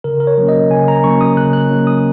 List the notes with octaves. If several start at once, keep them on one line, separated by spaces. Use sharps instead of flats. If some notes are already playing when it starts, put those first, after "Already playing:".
C#3 A#4
A#4
C#5
F#3 A#3 C#4
D#5
C#3 G#5
A#5
F#3 A#3 C#4 C#6
D#6
C#3 F#6
F#6
F#3 A#3 C#4
D#6